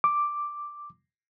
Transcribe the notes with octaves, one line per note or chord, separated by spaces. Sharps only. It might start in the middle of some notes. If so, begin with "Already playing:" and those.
D6